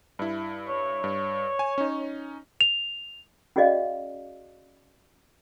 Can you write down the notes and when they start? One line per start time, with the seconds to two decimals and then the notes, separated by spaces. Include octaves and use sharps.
0.19 G2 E4
0.69 C#5
1.04 G2
1.59 G#5
1.78 C#4 D#4
2.61 F7
3.56 C#4 F#4 G#4 D5 D#5 F5